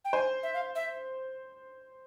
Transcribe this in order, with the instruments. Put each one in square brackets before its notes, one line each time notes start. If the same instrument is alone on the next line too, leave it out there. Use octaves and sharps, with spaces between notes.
[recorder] G5
[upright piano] C5 [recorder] G#5
[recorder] E5
F5
E5